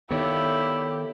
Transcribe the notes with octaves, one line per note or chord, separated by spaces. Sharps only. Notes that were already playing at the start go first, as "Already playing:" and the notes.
D#3 B3 E4 G4 A4 C#5 D5